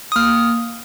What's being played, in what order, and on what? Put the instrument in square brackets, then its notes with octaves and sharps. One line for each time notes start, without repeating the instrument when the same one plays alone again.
[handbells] D#6
A#3 F6